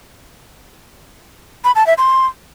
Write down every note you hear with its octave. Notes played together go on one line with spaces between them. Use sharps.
B5
A5
E5
C6